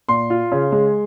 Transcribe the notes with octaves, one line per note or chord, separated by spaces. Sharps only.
A#2 C6
F4
C#3
G#3